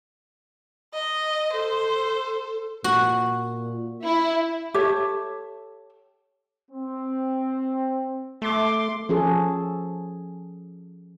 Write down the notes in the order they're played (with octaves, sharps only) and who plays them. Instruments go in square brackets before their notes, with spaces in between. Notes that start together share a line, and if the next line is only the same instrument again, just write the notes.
[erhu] D#5
[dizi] A4 [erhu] C5
[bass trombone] A#2 [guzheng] F#4
[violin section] E4
[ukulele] G4 A4 C#5 E5
[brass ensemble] C4
[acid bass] A3 [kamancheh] C6 D6
[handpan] F3 C#4 G#4 A4